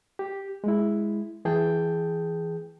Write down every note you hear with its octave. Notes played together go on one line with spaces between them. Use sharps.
G4
G#3 E4
E3 G#4 G5 A5 G6